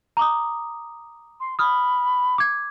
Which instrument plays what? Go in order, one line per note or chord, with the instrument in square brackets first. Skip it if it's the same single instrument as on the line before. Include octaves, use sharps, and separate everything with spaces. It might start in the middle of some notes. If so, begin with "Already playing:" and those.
[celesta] A#5 D6 D#6
[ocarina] C6
[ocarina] B5 [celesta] D#6 F6
[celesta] D6 G#6